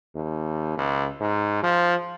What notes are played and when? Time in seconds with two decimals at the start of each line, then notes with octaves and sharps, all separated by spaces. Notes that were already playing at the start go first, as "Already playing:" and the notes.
0.16 D#2
0.78 C#2
1.21 G#2
1.63 F3